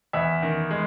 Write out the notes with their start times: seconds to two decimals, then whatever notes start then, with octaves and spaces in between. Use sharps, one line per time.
0.13 E2 E5
0.42 D#3
0.71 G#3